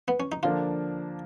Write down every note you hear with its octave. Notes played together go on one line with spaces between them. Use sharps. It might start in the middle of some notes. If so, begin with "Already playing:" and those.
B3
C#4
D#4
D3 F3 A#3 D4 F4